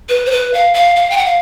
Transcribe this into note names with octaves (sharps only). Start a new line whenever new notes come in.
B4
C5
B4
F5
F5
F5
G5
F#5
F5